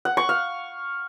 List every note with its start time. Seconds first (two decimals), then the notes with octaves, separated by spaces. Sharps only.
0.05 F#5
0.17 C#6
0.29 F5